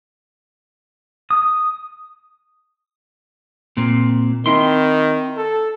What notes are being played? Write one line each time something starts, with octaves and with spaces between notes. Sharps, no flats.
D#6
A#2 C4
D#3 C4 E4 C6
A4